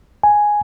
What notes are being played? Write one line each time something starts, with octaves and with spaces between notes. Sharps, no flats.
G#5